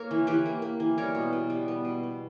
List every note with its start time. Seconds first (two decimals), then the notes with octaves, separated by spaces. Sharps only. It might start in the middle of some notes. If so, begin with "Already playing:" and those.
Already playing: A#3 A#4 C#5
0.11 E3
0.27 E3 G4 B4
0.46 A#3
0.62 A#3
0.80 E3
0.98 G3 A#4 C#5
1.15 B2
1.33 B2
1.50 G3
1.68 B3
1.85 B2
2.03 B2